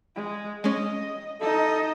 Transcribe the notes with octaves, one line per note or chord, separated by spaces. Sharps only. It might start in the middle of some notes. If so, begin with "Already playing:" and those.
G#3
G#3 C#4 D#5
D#4 A4 D#5